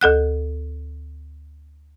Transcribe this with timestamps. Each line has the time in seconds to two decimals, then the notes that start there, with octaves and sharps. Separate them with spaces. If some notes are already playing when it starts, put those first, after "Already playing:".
0.01 D2 A4 F#5 F#6